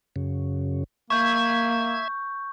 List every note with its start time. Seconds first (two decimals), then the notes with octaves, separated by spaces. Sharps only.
0.16 F#2 C#3
1.10 A#3 E5 C#6 G6 G#6